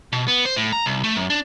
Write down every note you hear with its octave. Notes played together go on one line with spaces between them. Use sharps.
B2
B3
C5
A2
A#5
C2
A3
F#2
D4